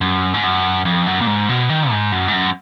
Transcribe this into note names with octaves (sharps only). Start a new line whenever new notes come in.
F#2
G#2
F#2
F2
F#2
A#2
G#2
B2
D#3
G#2
F#2
G#2
F#2